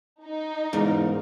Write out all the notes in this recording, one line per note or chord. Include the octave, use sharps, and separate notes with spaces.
D#4
E2 G#2 C#3 A#4